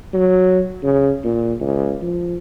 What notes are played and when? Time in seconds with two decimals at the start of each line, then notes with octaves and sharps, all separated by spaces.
0.14 F#3
0.83 C#3
1.24 A#2
1.60 C#2
2.02 F3